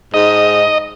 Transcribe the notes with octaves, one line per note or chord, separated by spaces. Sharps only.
G#2 D#5